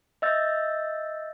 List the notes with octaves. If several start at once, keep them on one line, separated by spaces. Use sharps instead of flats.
D#5 E5 E6 G6 A6